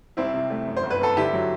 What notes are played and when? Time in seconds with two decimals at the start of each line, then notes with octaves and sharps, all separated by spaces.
0.17 C2 C4 E4
0.34 C3
0.50 A3
0.67 F#2
0.76 C5
0.83 G1
0.90 B4
1.01 G1 A4
1.17 D3 E4 G4
1.33 F#3